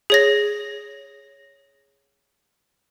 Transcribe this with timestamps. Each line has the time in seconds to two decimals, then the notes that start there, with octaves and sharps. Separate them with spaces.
0.10 G#4 C#5 A#6